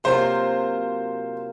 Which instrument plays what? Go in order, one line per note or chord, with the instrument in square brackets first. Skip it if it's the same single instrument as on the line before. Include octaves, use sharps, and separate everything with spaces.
[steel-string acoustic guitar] C3 F#3 A#3 F4 [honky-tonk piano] C5